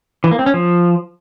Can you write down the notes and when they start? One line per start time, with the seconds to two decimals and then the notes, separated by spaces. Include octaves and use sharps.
0.24 E3
0.31 A#3
0.39 C4
0.46 C#4
0.54 F3